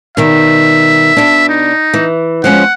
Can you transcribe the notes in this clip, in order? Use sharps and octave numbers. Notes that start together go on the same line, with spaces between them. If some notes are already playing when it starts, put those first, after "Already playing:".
B2 D#3 G3 E5
B2 D4
D#4
E3
F3 G#3 C#4 F#5